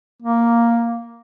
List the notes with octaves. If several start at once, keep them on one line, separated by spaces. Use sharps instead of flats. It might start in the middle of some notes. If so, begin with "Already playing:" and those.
A#3